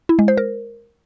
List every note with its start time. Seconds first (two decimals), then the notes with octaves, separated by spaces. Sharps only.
0.09 E4
0.19 G#3
0.28 C5
0.37 A#4